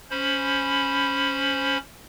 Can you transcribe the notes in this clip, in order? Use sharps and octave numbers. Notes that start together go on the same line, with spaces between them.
C#4 C5 B5